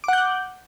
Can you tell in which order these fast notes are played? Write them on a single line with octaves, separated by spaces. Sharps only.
D6 F#5 G6 F#6